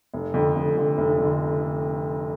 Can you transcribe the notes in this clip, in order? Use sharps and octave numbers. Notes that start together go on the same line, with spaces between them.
F1
F2 D3
F1
F2 D3
F1
F2 D3